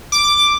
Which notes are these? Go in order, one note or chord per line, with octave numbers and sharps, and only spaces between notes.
D6